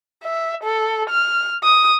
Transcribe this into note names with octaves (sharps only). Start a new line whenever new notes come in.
E5
A4
F6
D#6